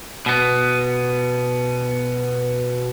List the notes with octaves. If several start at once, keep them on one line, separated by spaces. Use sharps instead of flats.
B2 B3